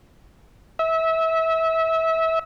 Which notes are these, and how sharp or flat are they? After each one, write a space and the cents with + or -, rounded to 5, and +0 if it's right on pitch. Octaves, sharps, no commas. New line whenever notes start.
E5 -25